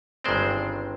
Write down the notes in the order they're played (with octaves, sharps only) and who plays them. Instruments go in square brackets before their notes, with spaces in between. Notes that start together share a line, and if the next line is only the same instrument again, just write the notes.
[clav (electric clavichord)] G1 G2 D#3 G#3 C4 C5 D5